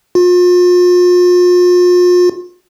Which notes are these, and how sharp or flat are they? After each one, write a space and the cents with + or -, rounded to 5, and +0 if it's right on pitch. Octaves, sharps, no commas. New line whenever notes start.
F4 +40